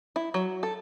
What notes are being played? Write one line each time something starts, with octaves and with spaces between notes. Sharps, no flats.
E4
F#3
A4